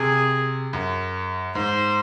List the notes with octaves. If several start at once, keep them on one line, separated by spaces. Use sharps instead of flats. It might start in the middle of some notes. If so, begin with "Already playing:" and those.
Already playing: C3 G#4
F#2
G#2 C5